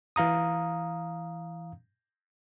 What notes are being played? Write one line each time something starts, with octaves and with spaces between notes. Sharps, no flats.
E3 F5 A#5 D#6